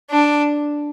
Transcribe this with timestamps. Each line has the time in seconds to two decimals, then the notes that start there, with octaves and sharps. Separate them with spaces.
0.11 D4